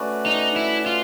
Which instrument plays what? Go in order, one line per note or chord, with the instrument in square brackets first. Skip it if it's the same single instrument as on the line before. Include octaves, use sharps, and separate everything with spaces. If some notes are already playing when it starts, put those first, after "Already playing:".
Already playing: [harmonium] A3 C#4 F#4 B4 D5
[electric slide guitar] D#4
E4
F4